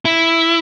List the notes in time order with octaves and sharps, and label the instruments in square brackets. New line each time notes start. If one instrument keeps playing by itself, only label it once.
[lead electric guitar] E4